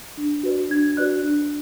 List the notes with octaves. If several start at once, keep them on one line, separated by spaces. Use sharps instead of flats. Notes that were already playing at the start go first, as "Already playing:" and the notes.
D4
F#4 B4 D5
D4 G#6
F#4 B4 D5 F#6
D4